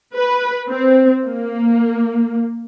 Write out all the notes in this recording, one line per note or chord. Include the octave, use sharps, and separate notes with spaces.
B4
C4
A#3